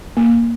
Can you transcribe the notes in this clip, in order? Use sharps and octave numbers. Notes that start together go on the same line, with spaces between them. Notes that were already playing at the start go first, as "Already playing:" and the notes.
A#3